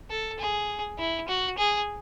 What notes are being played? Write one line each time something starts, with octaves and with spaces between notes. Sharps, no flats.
A4
G#4
E4
F#4
G#4